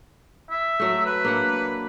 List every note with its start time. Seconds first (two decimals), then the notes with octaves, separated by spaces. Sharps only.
0.50 E5
0.80 F#3 A3
1.06 B4
1.25 A#3 D4 F#5